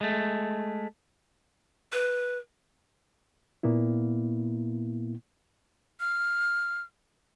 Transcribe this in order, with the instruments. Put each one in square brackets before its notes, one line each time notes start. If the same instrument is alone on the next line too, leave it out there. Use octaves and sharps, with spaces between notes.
[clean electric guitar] G#3 A3
[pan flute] B4
[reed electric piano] A#2 A#3 B3 E4
[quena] F6